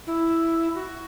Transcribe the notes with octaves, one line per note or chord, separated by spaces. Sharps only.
E4
F#4